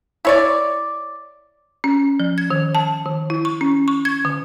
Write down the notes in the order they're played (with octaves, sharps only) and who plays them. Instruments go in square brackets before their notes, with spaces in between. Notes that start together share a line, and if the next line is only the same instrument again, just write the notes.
[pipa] E4 C#5 D5
[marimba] C#4
F3
G#6
D#3
A5
D#3
E4
C#6
C#4
C#6
G#6
D3